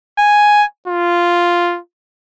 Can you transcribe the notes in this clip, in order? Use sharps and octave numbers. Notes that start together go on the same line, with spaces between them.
G#5
F4